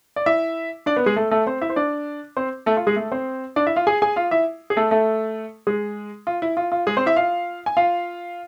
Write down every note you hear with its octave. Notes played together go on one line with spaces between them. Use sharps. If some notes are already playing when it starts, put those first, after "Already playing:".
D5
E4 E5
D4 D5
B3 B4
G#3 G#4
A3 A4
A3 A4
C4 C5
E4 E5
C5
D4 D5
C4 C5
A3 A4
F4
G#3 G#4
A3 A4
C4 C5
D4 D5
E4 E5
F4 F5
G#4 G#5
G#4 G#5
F4 F5
E4 E5
G#4
A3 A4
A3 A4
G#3 G#4
F4
E4
F4
F4
G#3 G#4
C4 C5
E4 E5
F4 F5
G#5
F4 F5